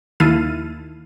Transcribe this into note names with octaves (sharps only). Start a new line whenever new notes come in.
D#2 D#3 E4 F5 A5 D#7